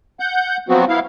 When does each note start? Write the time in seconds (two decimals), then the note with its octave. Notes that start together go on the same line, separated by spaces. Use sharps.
0.20 F#5 G6
0.69 F3 F#3 B3 C4 F#4
0.89 B3 E4 F5